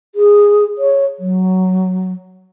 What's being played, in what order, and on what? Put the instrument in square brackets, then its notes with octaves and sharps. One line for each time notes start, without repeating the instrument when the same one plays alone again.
[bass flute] G#4
C#5
F#3